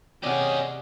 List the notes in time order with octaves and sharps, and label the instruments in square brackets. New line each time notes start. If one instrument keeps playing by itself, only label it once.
[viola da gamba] C3 G#4 [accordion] C#4 [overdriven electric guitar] G4 D#5 [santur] D5 F#5